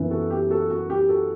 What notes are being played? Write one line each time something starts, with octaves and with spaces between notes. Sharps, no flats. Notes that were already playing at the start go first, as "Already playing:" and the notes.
Already playing: F#2 E3 B3
F#4 A4
G4
F#4 A4
F#4
G4
F#4 A4